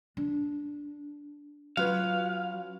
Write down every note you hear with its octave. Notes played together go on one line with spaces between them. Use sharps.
D4
F#3 C#4 F4 B4 F5